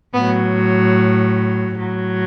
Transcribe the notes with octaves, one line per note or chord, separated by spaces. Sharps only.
A2 F#3 B3
A2 F#3